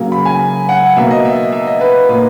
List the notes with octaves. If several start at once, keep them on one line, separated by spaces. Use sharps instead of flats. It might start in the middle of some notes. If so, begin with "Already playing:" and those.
Already playing: C#3 F#3 A#3
B5
G#5
F#5
B2 A#3 E5
D#5
E5
E5
D#5
B4
A#2 A#3 B4